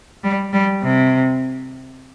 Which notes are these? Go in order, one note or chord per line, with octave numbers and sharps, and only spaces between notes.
G3
G3
C3